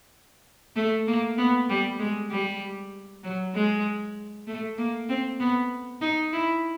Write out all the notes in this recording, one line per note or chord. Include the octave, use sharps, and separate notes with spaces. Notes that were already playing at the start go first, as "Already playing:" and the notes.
A3
A#3
B3
G3
G#3
G3
F#3
G#3
A3
A#3
C4
B3
D#4
E4